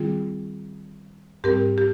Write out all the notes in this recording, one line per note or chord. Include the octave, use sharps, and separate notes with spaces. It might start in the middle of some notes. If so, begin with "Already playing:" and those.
Already playing: D#3 G3 C4 F4 G#4
G#2 G3 C4 G4 A#4
G4